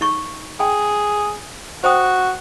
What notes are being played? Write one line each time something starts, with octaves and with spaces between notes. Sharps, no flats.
D#4 C#6
G#4 G5
F#4 C5 G5 D#6